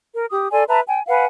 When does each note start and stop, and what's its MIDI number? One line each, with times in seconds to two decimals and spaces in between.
0.15 0.26 70
0.30 0.49 67
0.30 0.49 87
0.52 0.63 69
0.52 0.63 74
0.52 0.63 80
0.52 0.63 84
0.68 0.80 71
0.68 0.80 76
0.68 0.80 81
0.68 0.80 82
0.87 1.01 79
0.87 1.01 80
1.08 1.25 71
1.08 1.25 77
1.08 1.25 78
1.08 1.25 80